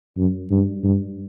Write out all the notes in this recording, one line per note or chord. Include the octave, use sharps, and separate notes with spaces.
F#2
G2
G2